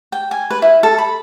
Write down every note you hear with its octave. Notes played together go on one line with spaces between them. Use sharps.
G5
G#5
B4
E4
A4
B5